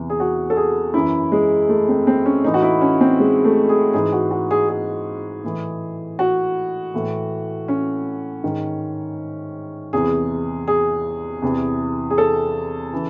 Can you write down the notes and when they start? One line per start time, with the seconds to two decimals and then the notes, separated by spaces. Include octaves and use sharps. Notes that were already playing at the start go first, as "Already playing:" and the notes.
Already playing: E2 C3 E3
0.10 G#4
0.20 F#4
0.50 A4
0.57 G#4
0.94 F#2 E3 E4
1.32 G#3
1.69 A3
1.88 C4
2.07 C4
2.26 C#4
2.44 A2 E3 D#4
2.54 F#4
2.62 E4
2.81 C#4
3.01 C4
3.20 G#3
3.44 A3
3.69 G#4
3.93 G#2 E3 G#4
4.12 F#4
4.31 F#4
4.51 G#4
4.69 G#4
5.44 A2 E3
6.19 F#4
6.94 A2 E3
7.68 C#4
8.44 G#2 D#3
9.93 E2 C3 E3 G#4
10.68 G#4
11.42 E2 C3 E3
12.10 G#4
12.18 A4
12.93 C#3 E3